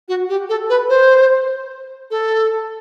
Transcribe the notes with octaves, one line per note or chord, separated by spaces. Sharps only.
F#4
G4
A4
B4
C5
A4